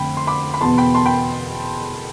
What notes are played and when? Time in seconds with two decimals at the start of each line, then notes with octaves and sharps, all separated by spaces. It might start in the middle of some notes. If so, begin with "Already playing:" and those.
Already playing: F2 D3 A3 C4 G5 B5
0.17 C6
0.27 B5 D6
0.54 B5
0.61 E2 B2 B3 A5 C6
0.78 G5 B5
0.94 A5 C6
1.05 G5 B5